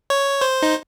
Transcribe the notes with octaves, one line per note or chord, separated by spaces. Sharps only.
C#5
C5
D#4